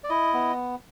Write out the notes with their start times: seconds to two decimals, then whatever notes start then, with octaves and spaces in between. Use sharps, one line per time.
0.04 D5
0.09 E4 D#5
0.34 B3